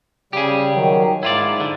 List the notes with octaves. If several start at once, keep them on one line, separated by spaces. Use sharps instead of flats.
C#3 G3 G4 G#4
D#3 F#3
G#2 E4 F4 D5
D3